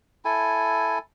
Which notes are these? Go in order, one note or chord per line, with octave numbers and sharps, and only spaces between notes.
E4 A4 G#5